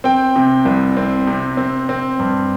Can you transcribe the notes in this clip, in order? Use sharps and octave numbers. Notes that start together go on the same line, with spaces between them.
C4 G5
C3
C2
C4
C3
C4
C4
G2